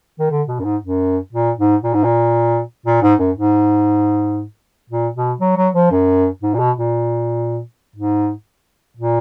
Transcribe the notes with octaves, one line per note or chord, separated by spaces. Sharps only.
D#3
D3
B2
F#2
G#2
F#2
A#2
G#2
A#2
G#2
A#2
A#2
G#2
F#2
G#2
A#2
B2
F#3
F#3
F3
F#2
G#2
A#2
B2
A#2
G#2
A#2